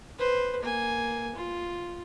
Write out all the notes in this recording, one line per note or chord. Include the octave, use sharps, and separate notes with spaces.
B4 C5
A#3 G#5
F4